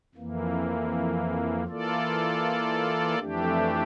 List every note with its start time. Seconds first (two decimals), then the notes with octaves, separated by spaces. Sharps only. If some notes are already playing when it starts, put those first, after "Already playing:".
0.15 F2 E3 A#3
1.67 E3 A#3 F4 A4 D5
3.18 F2 E3 A3 D4 G4